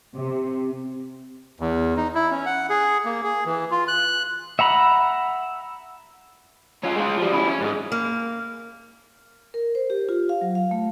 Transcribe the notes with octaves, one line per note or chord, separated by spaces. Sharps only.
C3
E2
D#4
E4
C#4
F#5
G#4
A#3
G#4
E3
F4
F#6
E5 F#5 A#5 B5
C#4 F4
G#3 F4
F3 G3
C#4 E4
C#4
G#2 G#3
A#3
A#4
C5
G4
F4
F5
F#3
F5
A3